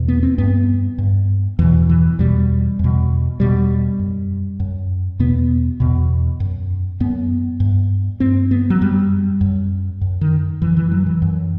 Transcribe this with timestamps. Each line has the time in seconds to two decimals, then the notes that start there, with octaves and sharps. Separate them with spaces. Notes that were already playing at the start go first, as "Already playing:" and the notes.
Already playing: E2 B2
0.08 B3
0.23 C4
0.38 G2 B3
0.98 G2
1.59 E2 B2 E3
1.89 E3
2.19 E2 B2 G3
2.79 E2 B2
3.39 E2 B2 G3
3.99 F#2
4.60 F#2
5.19 E2 B2 B3
5.80 E2 B2
6.40 F#2
7.00 F#2 B3
7.60 G2
8.20 G2 C4
8.51 B3
8.70 F#3
8.81 F#2 G3
9.41 F#2
10.01 F#2
10.21 D#3
10.62 F#2 E3
10.77 E3
10.92 F#3
11.06 E3
11.22 F#2